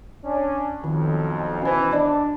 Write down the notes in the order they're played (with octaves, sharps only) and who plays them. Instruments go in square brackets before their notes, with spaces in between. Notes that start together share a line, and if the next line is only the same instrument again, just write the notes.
[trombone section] C#4 D4
[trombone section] B1 F2 [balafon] D#3
[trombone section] B2 E3 [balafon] C#4 C5
[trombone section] D4 [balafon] D5 D#5 B5